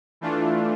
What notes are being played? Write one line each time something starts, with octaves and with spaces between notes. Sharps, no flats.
E3 A3 D4 F4